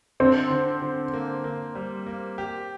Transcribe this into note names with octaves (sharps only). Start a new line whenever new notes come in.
D3 C4
D3
D3
A#3
A#3
G3
A#3
G4